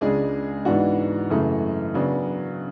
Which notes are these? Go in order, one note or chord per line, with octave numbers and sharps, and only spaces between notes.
C#2 C#3 G#3 D4 G#4
G#2 E3 B3 D4 F#4
F#2 C#3 E3 A3
C#3 F#3 B3 D4